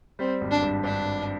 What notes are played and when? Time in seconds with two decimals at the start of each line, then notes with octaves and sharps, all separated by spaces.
0.19 G3 C4
0.41 G#1
0.51 D4
0.62 G2
0.84 G2 D4
1.04 G3